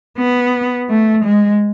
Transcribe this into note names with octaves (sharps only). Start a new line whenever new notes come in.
B3
A3
G#3